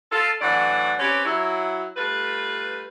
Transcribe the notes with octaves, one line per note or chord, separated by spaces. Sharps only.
F4 A4
A2 E3 F#3 D4 D5 F#5
C4 C#4 G4 B4 C#5 D5
F#3 E4
G3 A3 F4 B4